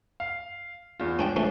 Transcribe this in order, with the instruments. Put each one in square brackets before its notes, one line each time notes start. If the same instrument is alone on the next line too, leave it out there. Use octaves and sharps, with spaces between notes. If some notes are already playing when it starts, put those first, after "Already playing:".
[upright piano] F5
E2 F4
[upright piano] G#2 [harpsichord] C#4 D4 G5
[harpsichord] F3 A3 C#4